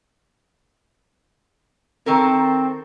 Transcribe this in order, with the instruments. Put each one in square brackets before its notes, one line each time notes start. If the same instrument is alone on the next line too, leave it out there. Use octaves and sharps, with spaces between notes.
[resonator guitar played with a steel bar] D#3 A4 A#4 [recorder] C4